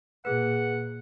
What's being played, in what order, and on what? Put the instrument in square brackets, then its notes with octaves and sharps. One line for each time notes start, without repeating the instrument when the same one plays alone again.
[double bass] A#2 [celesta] G#4 B4 [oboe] F#5